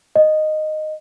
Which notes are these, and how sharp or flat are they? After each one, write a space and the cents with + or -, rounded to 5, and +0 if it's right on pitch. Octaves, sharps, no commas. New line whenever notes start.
D#5 -10